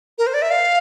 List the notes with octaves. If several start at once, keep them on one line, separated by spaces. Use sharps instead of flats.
A#4
C5
D5
E5
F5